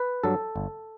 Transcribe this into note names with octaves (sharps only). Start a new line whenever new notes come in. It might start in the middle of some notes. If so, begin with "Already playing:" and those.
Already playing: B4
G2 F#3 A4
G1